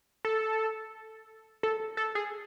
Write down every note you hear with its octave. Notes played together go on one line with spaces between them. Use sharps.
A4
A4
A4
G#4